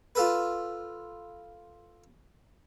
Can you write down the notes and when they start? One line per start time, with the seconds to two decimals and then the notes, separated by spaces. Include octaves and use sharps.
0.15 F4 A4 B4